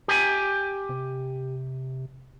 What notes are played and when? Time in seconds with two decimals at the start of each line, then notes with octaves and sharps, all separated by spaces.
0.08 G4 G#5
0.89 C3